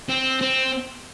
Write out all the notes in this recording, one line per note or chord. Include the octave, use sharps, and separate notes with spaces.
C4
C4